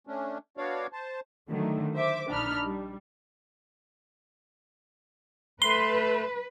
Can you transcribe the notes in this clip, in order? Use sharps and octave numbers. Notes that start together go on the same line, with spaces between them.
A3 C#4 D4
B3 D4 F#4 C#5 D5 F5
C5 A5
D3 D#3 F#3 A3
C5 E5 D6
A#1 D4 D#4 B5 F6
G3
A3 B4 C6